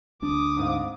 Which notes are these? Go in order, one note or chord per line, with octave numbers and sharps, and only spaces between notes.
D2 D4 D6 D#6
G#2 C4 F5